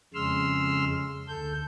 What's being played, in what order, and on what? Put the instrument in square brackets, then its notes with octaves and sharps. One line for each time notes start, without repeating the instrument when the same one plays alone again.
[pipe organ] F2 C#3 G#3 C6 E6 F6
D2 A4 G6